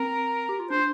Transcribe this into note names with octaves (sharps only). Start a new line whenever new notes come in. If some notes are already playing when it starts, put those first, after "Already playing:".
Already playing: C4 A#4
G4
F4
D4 C5